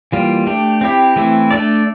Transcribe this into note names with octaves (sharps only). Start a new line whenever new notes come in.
E3 G3 A#3 F4
A3 D4 G4
C4 E4 G4
E3 A3 C4 E4
A3 D4 A4 D5